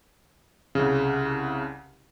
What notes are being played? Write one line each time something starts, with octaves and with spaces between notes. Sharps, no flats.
C2 C#3